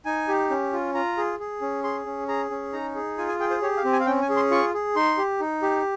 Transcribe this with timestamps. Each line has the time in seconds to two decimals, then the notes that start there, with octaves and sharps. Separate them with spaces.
0.05 D#4 G#5
0.28 G4
0.50 C#4
0.73 F4
0.94 F4 A#5
1.17 G#4
1.40 G#4
1.62 C#4
1.83 G#4 C6
2.06 C#4
2.28 G#4 A#5
2.51 C#4
2.73 D#4 A#5
2.95 G#4
3.18 F4 G#5
3.28 G#5
3.40 G#4 G5
3.50 C5
3.62 G4 C#5
3.77 F5
3.84 C4
3.92 G#5
4.00 F5
4.06 C#4 G5
4.22 G#5
4.29 G#4
4.36 C6
4.51 F4 C#6
4.74 G#4
4.96 D#4 C6
5.18 G4
5.40 D#4
5.62 G4